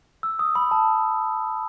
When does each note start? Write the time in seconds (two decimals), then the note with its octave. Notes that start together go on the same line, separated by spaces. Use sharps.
0.23 E6
0.39 D#6
0.55 B5
0.71 A5